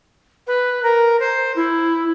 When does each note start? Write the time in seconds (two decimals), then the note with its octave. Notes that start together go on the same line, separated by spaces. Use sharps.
0.47 B4
0.83 A#4
1.19 C5
1.56 E4